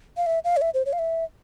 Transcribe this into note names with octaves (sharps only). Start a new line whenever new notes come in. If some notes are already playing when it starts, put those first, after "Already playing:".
F5
E5
F5
C#5
E5
C5
C#5
F5
E5